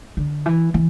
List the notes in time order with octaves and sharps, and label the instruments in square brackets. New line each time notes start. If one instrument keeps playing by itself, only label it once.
[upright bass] D3
E3
E3